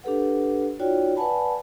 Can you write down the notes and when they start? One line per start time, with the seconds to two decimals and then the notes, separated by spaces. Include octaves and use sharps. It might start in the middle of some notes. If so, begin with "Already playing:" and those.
0.04 D4 G4 A4 B4 F#5
0.79 D#4 F4 F#4 C#5 D5 G5
1.16 B4 D5 F#5 G#5 A5 B5